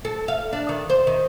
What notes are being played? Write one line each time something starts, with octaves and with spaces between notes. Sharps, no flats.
A4
F5
D4
D#3
C5
D#3